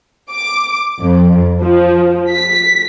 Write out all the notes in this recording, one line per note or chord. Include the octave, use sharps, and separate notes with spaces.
D6
F2
F3
B6